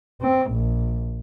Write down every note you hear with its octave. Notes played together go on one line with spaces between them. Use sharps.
C4
A#1